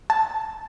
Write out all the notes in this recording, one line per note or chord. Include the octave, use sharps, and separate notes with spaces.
A5